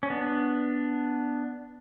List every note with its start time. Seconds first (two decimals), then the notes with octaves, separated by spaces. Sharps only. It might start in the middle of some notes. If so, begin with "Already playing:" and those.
0.03 C#4
0.10 B3 D4